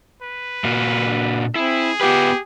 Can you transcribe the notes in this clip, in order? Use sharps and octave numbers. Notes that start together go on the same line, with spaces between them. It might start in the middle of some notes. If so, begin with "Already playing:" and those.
B4
A#2 A#3 F#4
D4
C4 E4 G#4
B3 F4 G4 B4